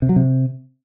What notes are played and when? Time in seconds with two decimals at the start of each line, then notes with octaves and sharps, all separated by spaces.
0.02 C3
0.09 F#3
0.16 C3